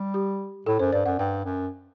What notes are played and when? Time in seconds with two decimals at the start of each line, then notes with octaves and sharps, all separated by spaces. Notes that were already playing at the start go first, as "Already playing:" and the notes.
Already playing: G3
0.14 G4
0.66 A2 A4
0.79 F#2 C5
0.92 G2 D5
1.06 F#2 F#5
1.19 G2 G5
1.45 F#2